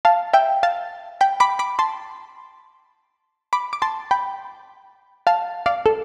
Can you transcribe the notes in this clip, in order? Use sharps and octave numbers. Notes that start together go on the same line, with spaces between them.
F5 A5
E5 G5
F5 A5
G5 B5
B5 D6
B5 D6
A5 C6
B5 D6
D6
A5 C6
G5 B5
F5 A5
D5 F5
A4